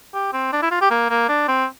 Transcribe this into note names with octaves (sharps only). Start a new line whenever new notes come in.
G4
C4
D4
E4
F4
G4
A#3
A#3
D4
C4